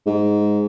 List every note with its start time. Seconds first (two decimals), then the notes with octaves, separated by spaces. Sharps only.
0.06 G#2